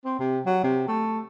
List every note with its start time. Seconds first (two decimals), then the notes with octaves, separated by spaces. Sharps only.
0.05 C4
0.20 C3
0.46 F#3
0.64 C3
0.88 A3